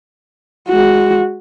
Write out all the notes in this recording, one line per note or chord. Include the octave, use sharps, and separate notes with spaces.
G#3 F#4